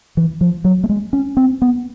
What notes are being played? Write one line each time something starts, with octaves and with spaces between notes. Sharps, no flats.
E3
F3
F#3
A3
G#3
C#4
C4
B3